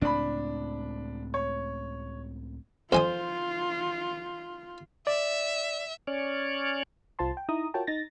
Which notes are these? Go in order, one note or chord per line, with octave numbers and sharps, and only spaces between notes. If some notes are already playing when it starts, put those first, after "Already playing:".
C#2 A2 C4 D4 B5
C#5
F2 F4 C5 G#5 D#6
D5 E5
C#4 C#5 D5
C2 F4 C5 A5 C6
G5
D#4 E4 A#5 D#6
F4 F#4 A#4 C#5 G5 A5
D#4 A6 A#6